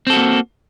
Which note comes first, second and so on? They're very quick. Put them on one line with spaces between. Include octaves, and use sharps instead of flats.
C4 A4 F#4 A#3